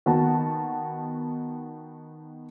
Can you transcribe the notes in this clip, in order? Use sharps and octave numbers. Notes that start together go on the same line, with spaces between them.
D#3 B3 F#4 A5